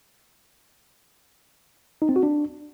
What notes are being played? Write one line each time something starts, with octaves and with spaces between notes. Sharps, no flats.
D#4
C4
F#4
D4